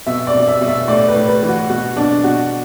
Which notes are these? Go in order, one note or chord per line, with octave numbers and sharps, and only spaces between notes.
B2 E5
D5
B2
E5
B2
E5
A2 D5
B4
A2
B4
E3
F#4
B2 F#4
B2 D4
B2 F#4